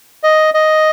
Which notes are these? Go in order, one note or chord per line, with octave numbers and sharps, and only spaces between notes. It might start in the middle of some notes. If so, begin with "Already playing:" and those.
D#5
D#5